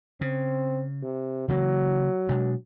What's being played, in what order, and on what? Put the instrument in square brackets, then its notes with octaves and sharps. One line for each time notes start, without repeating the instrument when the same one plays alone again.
[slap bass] C#3 [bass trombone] C4
[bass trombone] C3
[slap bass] C#3 E3 A#3 [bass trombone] F#3
[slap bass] B2 G#3 D4